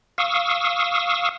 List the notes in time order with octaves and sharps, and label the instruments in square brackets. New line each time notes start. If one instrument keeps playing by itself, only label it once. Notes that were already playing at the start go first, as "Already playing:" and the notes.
[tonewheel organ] F5 C#6 D#6 E6